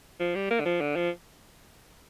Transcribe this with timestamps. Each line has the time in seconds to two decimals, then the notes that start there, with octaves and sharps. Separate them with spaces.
0.20 F3
0.35 G3
0.50 A#3
0.60 D3
0.65 F3
0.81 D3
0.96 F3